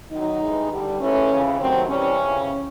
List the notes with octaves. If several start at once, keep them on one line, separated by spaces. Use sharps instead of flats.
F#2 D#3 F#3 D#4
G2 E3 G#3
G2 D3 G3
G#2 E3 A3 C#4
F2 C#3 E3
G2 D#3 F#3 A3 C4
C3 E3 G3 C#4
F2 C#3 E3